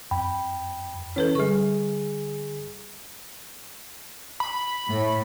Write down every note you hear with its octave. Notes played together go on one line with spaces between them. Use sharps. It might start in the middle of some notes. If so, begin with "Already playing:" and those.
F2 G5 B5
E3 C#4 E4 A4 B4 C#5
D3 G3 G#4 C#6
B5
A2